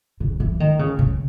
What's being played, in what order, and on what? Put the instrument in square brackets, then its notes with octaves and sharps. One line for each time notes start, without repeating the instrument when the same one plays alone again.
[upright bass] C#3
E3
D#3
C#3
C#3